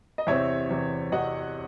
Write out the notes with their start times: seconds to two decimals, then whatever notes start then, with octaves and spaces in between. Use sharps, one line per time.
0.18 D#5
0.27 E2 C3 E3 C4 C#5 E5
0.69 E2 C3 E3 C4
1.12 E2 C3 E3 C4 D#5 F#5